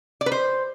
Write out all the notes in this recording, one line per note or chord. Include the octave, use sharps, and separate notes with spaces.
D5
B4
C5